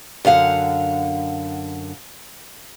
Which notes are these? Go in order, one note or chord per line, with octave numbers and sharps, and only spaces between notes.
F#2 D3 F5 F#5